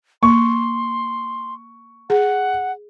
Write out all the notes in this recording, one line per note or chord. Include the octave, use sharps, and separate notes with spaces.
A#3 C6 C#6
G#4 F#5